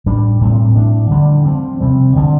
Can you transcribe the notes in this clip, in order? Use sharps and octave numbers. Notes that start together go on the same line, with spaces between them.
A2 G3 D4
A2 G3 C4
A2 F3 D4
D3 G3 D4
F3 C4
C3 G3 C4
D3 F3 C4